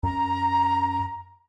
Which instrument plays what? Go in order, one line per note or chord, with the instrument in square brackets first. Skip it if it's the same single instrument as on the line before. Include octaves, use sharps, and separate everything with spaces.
[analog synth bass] F#2 [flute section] A#5